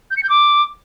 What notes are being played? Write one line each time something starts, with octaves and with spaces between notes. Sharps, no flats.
G6
C#7
G6
D6